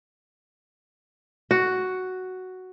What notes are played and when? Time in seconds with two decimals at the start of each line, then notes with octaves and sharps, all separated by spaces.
1.51 F#4